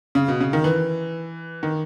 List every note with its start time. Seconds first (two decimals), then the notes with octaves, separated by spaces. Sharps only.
0.15 C#3
0.28 B2
0.41 C#3
0.53 D#3
0.64 E3
1.63 D#3